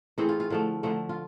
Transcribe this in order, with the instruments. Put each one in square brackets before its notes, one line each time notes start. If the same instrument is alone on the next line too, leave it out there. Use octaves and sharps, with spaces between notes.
[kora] E3 A3 C4 G#4
F4
F4
D3 F3 A3 F4
D3 F3 A3
F4